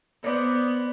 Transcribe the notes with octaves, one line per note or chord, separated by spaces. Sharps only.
B3 C5 D5 D#5